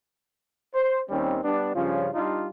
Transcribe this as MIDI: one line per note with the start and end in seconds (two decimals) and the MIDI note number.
0.75 1.01 72
1.10 1.39 39
1.10 1.39 51
1.10 1.39 55
1.10 1.39 60
1.10 1.39 61
1.43 1.73 55
1.43 1.73 59
1.43 1.73 62
1.74 2.08 43
1.74 2.08 49
1.74 2.08 53
1.74 2.08 61
1.74 2.08 65
2.14 2.46 55
2.14 2.46 62
2.14 2.46 63
2.14 2.46 65